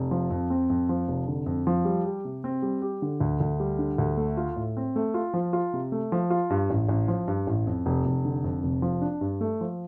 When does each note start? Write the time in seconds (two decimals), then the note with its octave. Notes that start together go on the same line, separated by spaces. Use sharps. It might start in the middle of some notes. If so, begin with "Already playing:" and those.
Already playing: F1
0.11 F3
0.30 F2
0.50 C4
0.70 F2
0.89 F3
1.08 F1
1.28 D3
1.46 F2
1.67 F3
1.85 G3
2.05 G4
2.25 C3
2.44 C4
2.62 G3
2.82 G4
3.02 D3
3.21 D2
3.40 D2
3.60 G3
3.79 D3
3.98 D2
4.17 A3
4.37 F4
4.56 A2
4.77 C4
4.96 A3
5.14 F4
5.34 F3
5.53 F4
5.74 C3
5.92 A3
6.12 F3
6.30 F4
6.50 G2
6.70 A1
6.89 A1
7.08 F3
7.28 G2
7.47 A1
7.67 F2
7.86 F1
8.06 F1
8.25 D3
8.44 F2
8.63 F1
8.82 F3
9.02 D4
9.21 G2
9.41 A3
9.61 F3